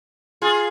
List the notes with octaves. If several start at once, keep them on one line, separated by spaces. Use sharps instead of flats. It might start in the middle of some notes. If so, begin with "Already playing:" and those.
F4 G#4